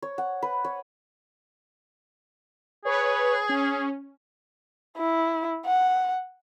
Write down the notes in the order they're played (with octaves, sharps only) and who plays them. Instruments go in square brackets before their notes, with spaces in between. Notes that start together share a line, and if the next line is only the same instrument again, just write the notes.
[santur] C#5
F#5
B4
C#5
[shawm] G#4 [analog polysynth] B4 C#5
[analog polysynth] C#4
[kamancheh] E4
F#5